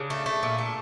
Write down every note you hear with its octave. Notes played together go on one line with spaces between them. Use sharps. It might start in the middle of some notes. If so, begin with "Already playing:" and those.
Already playing: C#3 D4
A3
A3
A#2
A3